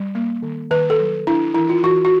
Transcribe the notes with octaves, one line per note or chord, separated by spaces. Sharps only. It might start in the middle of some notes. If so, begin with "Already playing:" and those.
Already playing: G3
A#3
D#3
D#3 B4
A4
F#3
D4 E4
E3 E4
F4
E3 F#4
F#4